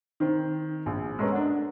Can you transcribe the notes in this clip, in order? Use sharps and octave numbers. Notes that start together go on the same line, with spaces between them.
D#3 C4
A#1
G#3 A3 B3 C#4 A#4
D4 F#5